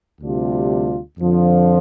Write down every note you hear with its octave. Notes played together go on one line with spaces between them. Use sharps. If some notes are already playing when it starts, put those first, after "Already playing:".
D2 C3 G3 D4 F4
F2 D3 F3